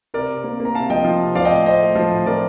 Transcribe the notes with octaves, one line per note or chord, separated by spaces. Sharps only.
C3 A#4 D5
C3
A#3
A#3
A#5
C3 F5 A5
F3 D#5 G5
F3
C3
F3 D5 F5
D#5 G5
A2
A3 C5 D#5
A3
F3
A2
F3 A#4 D5